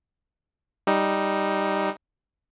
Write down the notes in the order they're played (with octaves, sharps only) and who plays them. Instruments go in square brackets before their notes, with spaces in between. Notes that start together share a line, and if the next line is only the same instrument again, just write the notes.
[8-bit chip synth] G3 D#4